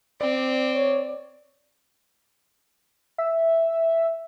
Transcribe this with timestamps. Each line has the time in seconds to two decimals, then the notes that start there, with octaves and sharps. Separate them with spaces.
0.21 C4 D5
0.74 C#5
3.18 E5